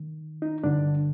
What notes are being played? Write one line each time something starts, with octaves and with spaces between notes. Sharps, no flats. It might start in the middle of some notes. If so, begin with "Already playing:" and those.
Already playing: D#3
D#4
G2 D3 D4